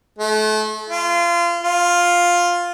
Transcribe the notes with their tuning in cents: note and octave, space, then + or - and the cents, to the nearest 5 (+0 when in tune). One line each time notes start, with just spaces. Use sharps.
A3 -35
F4 -25
F4 +5